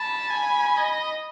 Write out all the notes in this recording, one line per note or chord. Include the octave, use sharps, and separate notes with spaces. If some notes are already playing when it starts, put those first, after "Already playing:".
Already playing: A5 B5
G#5
D#5